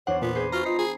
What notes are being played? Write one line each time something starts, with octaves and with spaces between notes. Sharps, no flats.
E2 D4 C5 C#5 F#5
A#2 B3 F4
G#4 B4 C5 G#5
F4 F#4 F5 A#5 B5
D#4 F4 C7
G#4